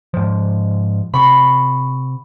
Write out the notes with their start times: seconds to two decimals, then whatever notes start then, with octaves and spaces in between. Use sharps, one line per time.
0.14 G#2 F3
1.14 C3 B5 C#6